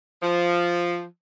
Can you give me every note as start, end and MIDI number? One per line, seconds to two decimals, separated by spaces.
0.22 1.03 53